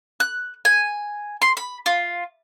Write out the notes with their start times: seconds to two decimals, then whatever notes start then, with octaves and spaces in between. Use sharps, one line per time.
0.20 F#6
0.65 G#5
1.42 C6
1.57 B5
1.86 F4